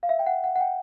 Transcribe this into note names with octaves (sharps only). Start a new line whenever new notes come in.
F5
E5
G5
F#5
F#5
F#5
G5